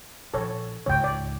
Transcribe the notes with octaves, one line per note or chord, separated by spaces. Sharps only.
A#1 A4 C#5
C#2 G#2 C#5 G5
D5